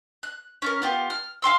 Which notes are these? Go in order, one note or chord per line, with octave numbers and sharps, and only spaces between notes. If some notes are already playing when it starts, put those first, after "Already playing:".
F#6
C#4 D4 A#4
B3 F4 G4
F6
F5 G5 C6 E6